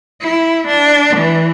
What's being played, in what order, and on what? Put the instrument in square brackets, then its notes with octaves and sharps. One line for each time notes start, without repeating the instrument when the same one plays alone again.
[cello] E4
D4
E3